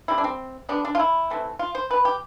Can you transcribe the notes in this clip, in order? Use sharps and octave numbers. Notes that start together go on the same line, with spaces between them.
D3 G3 C4 E4
D4
C4
D3 G3 B3 D4
D4
F4
E4
E3 A3 C4
F4
C5
B2 B3 B4
G4